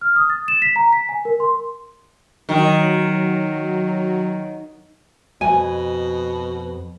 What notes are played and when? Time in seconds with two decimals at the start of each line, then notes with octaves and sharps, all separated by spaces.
0.01 F6
0.16 D#6
0.30 A6
0.48 E7
0.62 B6
0.76 A#5
0.93 B6
1.09 G#5
1.25 A#4
1.40 C6
2.49 D#3 F#3
5.41 F2 B2 G#5